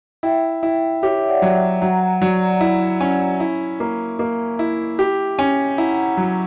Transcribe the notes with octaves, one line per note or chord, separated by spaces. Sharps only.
E4 E5 G5
E4
G4 C#5 E5
D5 F#5
F#3
E5 G5
F#3 F#5 A#5
F#3 D5 F#5
E4
C#4
E4
A#3
A#3
E4
G4
C#4
E4 F#5 A#5
F#3